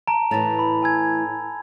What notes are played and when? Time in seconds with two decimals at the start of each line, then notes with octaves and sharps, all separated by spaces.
0.07 A5 A#5 D7
0.31 A2 E3 A5 A6 F7
0.59 B5
0.82 G#5 E6 G#6